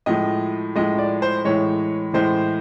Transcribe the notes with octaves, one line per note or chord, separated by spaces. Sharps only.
A2 F3 G#3 D#5
A2 F3 G#3 D#5
D5
C5
A2 E3 G#3 C#5
A2 E3 G#3 C5